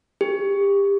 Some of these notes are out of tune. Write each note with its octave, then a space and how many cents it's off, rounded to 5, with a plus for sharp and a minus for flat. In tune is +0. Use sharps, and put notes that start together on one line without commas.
G4 +25